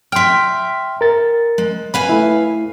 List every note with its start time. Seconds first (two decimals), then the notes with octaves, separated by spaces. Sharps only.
0.12 E5 G5 C6 F6
1.01 A#4 A6
1.58 G#3
1.94 B4 F5 G#5 B5
2.09 A3 E4